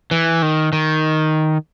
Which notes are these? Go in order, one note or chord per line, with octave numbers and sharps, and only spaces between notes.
E3
D#3
D#3